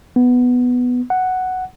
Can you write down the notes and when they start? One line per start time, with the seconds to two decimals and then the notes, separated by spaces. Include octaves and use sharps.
0.16 B3
1.10 F#5